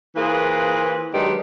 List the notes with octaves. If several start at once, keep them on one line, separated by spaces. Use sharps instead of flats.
E3 A#3 F4 G#4 B4 C5
D#3 F#3 G#3 D4 G4 B4